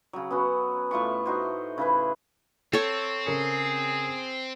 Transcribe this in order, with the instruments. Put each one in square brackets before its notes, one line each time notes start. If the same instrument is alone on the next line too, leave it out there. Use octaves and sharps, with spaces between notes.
[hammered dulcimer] C#3 F#3
B3 C#4 F#4
A2 A3 F4 C#6
D#4 F#4 C5
C#3 E4 B4
[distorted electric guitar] C4 [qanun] A4 C#5
[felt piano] C#3 A#4 C#7 [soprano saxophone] G#4